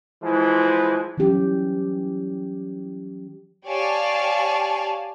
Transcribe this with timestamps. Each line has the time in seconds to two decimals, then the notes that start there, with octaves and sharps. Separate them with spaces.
0.22 E3 F3 G#3
1.18 E3 F#3 C#4 G4
3.67 G4 C#5 D5 F5 G#5 A5